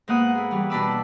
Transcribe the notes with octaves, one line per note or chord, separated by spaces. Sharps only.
G#2 A#3 B3 F#5 D#6 F#6
E4 G#4
E3 G3
B2 D4 A5 B5 D6 E6